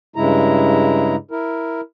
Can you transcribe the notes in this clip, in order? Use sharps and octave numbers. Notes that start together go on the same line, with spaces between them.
G2 C#3 G#3 E4 A#5
E4 A#4